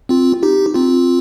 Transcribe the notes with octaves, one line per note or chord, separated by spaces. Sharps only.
C4 F4
D#4 G4
C4 F4